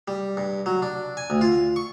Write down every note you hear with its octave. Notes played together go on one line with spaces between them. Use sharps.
G3
G2
F#3
D4
G#5
D2
F4
C#6